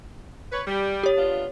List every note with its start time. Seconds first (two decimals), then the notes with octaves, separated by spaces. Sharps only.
0.52 B4 C#5
0.67 G3
1.03 G4 C#5
1.16 B3 D4 F4